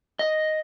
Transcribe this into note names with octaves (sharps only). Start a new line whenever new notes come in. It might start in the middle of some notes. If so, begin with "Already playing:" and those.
D#5